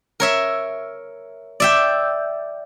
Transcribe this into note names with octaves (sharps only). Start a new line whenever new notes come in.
A#4 C#5 E5
D5 E5 G5